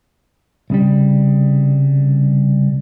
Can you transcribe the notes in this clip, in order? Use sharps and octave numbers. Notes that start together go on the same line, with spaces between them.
C2 C#3 G3